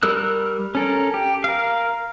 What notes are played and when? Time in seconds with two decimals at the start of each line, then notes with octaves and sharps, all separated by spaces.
0.03 G3 A#4 E6 F#6
0.75 C#4 A4 A#4
1.14 G4
1.44 A#4 F5